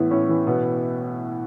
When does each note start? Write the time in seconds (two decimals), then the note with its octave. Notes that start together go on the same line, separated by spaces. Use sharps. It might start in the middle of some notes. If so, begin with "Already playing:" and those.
Already playing: A2 E3 B3
0.11 A2 C#4
0.29 E3
0.47 B2 B3